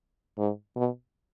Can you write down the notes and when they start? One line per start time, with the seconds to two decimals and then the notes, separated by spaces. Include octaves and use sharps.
0.38 G#2
0.76 B2